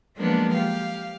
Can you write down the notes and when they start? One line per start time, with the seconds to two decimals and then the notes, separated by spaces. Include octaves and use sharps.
0.17 F3 F#3 G#3 A#3 B3 D4
0.51 G4 F5